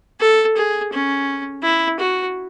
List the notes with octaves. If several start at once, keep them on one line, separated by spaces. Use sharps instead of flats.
A4
G#4
C#4
E4
F#4